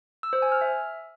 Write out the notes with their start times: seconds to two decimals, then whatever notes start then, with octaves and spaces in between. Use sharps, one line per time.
0.23 E6
0.33 C5
0.42 G#5
0.52 F6
0.61 E5